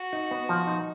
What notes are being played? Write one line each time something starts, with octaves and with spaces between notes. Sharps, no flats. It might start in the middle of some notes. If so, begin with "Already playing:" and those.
Already playing: F#4
D#4
B3
F3
D#4